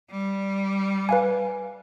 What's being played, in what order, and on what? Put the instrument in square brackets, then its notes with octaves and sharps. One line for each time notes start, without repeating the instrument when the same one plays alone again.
[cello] G3
[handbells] B4 F5 G#5